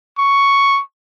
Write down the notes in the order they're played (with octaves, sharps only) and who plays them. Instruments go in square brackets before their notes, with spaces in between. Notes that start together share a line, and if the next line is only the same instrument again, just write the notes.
[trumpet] C#6